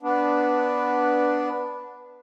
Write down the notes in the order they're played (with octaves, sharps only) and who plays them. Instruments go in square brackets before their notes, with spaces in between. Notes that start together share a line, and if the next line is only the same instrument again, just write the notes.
[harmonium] B3 D4